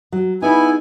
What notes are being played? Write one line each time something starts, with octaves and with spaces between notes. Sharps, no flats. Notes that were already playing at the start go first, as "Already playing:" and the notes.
F#3
B3 D#4 E4 G#4 G#5